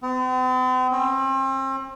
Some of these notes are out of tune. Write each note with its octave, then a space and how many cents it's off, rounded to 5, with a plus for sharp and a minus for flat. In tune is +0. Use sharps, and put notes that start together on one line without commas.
C4 -45
C4 +40